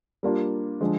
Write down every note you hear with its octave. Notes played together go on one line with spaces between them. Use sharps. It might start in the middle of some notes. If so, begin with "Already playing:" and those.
G3 A#3 D4 F4
D3 F3 G#3